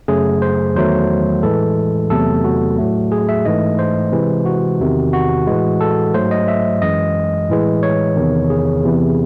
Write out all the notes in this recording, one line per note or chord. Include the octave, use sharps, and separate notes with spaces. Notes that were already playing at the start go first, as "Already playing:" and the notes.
F#2 C#3 F#3 A3 G#4
C5
E2 D#3 F#3 A3 C5
A2 E3 G#3 A4
E2 C3 F#3 A3 A4
F#4
A2 F#3 A3
G#4
E5
G#2 E3 A3 D#5
C5
C3 E3 G#3
F#4
E2 C3 D#3
F#4
A2 E3 G#3
A4
G#2 F#3 A3 C5
D#5
E5
F#2 E3 G#3 D#5
A2 E3 G#3
C#5
E2 C3 D#3
G#4
E2 C3 E3